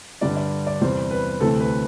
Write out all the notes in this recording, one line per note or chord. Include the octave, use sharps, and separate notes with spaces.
G2 D3 G3 D5
D5
D5
E2 C3 G3 C5
B4
D2 C3 E3 A3 A4
B4